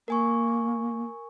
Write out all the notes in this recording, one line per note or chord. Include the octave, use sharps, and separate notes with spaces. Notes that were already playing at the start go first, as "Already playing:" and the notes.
A#3 A#4 G#5 C#6